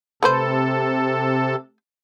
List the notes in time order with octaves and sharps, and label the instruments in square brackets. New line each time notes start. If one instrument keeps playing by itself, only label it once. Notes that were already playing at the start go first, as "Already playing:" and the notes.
[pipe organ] C3 A4 [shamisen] A3 B4 C5